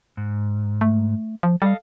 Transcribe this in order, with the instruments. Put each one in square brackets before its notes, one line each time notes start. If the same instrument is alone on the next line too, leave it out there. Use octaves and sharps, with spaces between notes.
[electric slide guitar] G#2
[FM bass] A3
F3
[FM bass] G3 [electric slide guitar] A4 D#5 F5